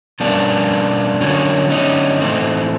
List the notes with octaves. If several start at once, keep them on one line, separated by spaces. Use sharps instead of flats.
B2 G3 A#3 C#4 D4
D3 F#3 A#3 C#4
C#4 D#4
A2 E3 A3 C4